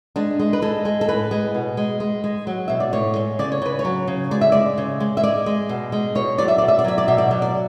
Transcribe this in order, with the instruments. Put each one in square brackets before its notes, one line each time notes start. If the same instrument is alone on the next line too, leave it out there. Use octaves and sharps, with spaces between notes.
[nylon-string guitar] G#3 D4
G#3
B4
G#3 A4
G#3
A4
A2 B4
G#3
B2
G#3
G#3
G#3
F#3
B2 E5
D5
A2 C#5
G#3
C#3 D5
C#5
C#3 B4
C#5
F#3
C#3
G#3 D5
E5
G#3 D5
C#3
G#3
E5
G#3 D5
G#3
B2
G#3
B2 C#5
F#3 D5
E5
B2 D5
E5
D5
F#3 E5
D5
B2 E5
D5
F#3
D5